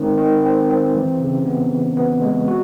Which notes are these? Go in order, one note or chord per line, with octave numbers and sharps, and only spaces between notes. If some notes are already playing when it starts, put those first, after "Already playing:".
Already playing: D#3 G#3 C4
D#3
C4
C4
E3
C#3
B3
E3
B3
G#3
F#4